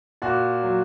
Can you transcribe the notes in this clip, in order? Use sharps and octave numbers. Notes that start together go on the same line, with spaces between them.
A#2 F#4
F#3